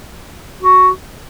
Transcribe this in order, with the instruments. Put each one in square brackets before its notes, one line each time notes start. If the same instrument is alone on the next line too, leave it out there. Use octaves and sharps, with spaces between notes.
[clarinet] F#4